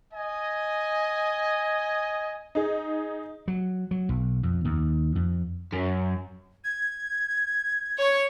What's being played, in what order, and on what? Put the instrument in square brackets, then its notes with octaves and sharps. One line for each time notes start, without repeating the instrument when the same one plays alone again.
[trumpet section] D#5 G#5
[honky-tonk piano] D#4 G#4
[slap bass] F#3
F#3
B1
F2
D#2
F2
[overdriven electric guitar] F#2
[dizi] G#6
[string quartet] C#5 C#6